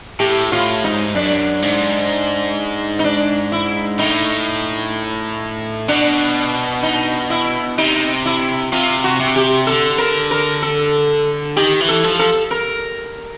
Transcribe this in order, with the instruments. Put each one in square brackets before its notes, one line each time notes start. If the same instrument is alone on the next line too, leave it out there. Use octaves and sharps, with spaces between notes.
[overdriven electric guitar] A2 [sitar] G4
[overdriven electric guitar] A2 [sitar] F4
[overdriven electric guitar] G#2 [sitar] D#4
[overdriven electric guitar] F#2 [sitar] D4
[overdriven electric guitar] G#2
[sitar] D#4
D4
E4
[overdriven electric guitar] A2 [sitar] D#4
[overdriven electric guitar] B2 [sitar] D4
[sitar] D#4
E4
[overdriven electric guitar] C3 [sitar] D#4
[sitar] E4
[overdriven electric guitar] C3 [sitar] F4
[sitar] F#4
[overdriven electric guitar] C3
[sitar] G4
[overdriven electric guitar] D3 [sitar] A4
[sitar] A#4
A#4
A4
[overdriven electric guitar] D#3 [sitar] G4
[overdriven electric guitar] E3
[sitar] A4
[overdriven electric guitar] F3
[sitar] A4
A#4